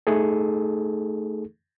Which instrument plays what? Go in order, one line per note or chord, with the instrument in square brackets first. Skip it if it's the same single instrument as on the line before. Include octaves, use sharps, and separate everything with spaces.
[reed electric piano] A3 D#4 G#4 A4